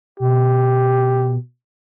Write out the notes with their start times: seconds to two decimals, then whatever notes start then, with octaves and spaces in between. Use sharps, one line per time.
0.20 B2 G4